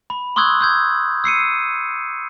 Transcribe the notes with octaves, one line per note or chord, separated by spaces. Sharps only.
B5
C6 C#6 D#6 E6 F#6 G#6
E6 G6 G#6
E6 C7 C#7 D#7